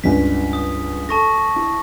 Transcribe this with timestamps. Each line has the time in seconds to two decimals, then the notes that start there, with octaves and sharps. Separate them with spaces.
0.04 C#2 G2 B6
0.53 D#6
1.09 A4 A5 C#6 A#6
1.56 E4